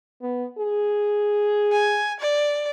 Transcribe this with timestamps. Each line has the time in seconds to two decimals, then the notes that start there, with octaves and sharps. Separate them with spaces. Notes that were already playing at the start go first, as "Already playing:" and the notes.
0.22 B3
0.59 G#4
1.72 G#5
2.20 D5